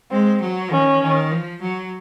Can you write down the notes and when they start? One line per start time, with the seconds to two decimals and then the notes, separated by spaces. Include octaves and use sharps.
0.11 G#3 C4
0.41 F#3
0.71 D#3 C#4
1.02 D#3
1.32 F3
1.62 F#3